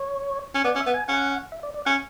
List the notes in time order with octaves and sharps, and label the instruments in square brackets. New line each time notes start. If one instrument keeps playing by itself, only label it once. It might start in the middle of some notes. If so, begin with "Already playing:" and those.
Already playing: [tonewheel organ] C#5
[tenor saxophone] C#4
[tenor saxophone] B3 [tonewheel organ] D5
[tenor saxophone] C#4
[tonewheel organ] E5
[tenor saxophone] B3 [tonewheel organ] F#5
[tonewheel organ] G#5
[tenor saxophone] C#4 [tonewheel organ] F#5
[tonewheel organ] E5
D5
D5
[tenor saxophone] C#4 [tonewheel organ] F#5